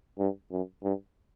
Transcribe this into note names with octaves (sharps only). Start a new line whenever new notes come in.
G2
F#2
G2